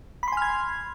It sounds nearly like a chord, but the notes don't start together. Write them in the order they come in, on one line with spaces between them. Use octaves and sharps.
B5 C6 G#5 F6 G#6